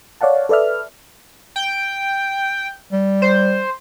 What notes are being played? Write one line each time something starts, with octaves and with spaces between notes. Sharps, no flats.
C#5 D5 F5 F#5 A5
A4 B4 D5 E5 F6
G5
G3
C5